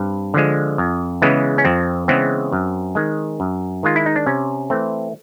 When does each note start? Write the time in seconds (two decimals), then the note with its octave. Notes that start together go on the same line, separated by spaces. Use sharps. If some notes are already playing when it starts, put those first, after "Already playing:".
Already playing: G2 C4
0.34 D3 F3 G#3
0.78 F2
1.22 C#3 E3 G#3 B3
1.58 C#4
1.65 F2 C4
2.08 C#3 E3 G#3 B3 C4
2.52 F#2
2.95 D#3 G#3
3.40 F#2
3.83 D#3 G#3 F4
3.96 E4
4.06 D#4
4.16 D4
4.26 C3 C#4
4.70 E3 A3 C4